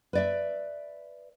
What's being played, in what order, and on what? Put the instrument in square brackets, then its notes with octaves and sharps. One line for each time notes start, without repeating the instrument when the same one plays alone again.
[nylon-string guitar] B4 D5 E5